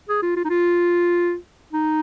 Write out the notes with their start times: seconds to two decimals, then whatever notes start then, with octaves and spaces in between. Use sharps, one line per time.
0.09 G#4
0.22 F4
0.36 F4
0.45 D#4
0.50 F4
1.73 D#4